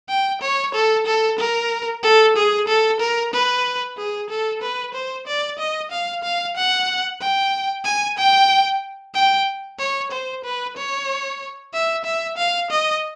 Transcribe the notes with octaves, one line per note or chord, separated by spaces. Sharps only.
G5
C#5
A4
A4
A#4
A4
G#4
A4
A#4
B4
G#4
A4
B4
C5
D5
D#5
F5
F5
F#5
G5
G#5
G5
G5
C#5
C5
B4
C#5
E5
E5
F5
D#5